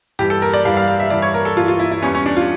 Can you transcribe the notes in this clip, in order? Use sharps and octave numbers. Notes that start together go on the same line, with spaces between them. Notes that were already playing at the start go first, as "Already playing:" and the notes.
G2 E3 G3 G4
A4
A#4
D5
G2 E3 G3 F5
F5
F5
E5
G2 E3 G3 D5
C#5
A#4
A4
G2 E3 G3 F4
F4
E4
E4
E2 E3 G3 C#4
C#4
D4
F4